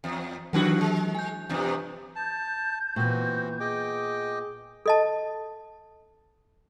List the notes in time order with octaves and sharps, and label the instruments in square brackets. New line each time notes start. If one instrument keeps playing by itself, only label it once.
[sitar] E2
[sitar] D#2 D#3 F#4 [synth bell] E3 F#3 D4
[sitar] G#3
[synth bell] G#5 G6
[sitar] E2 G2 C3
[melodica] A5 [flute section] G6
[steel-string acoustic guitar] A#2 B3 [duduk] E3 [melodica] C4 F#4
[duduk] G#4 [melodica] D#5 G5 D6
[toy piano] A4 D#5 A5